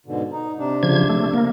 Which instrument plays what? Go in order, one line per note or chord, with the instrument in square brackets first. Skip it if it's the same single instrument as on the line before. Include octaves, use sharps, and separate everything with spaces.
[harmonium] G#2 B2 D3
D#4
C3 D4
[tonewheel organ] C#3 F3 G#6
A3
A#3